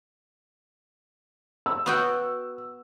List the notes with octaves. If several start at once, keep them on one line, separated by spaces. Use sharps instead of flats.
E6
B3 F#4 G5